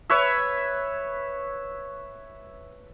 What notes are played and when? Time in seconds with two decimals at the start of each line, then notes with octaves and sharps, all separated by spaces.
0.10 B4 C#5 E5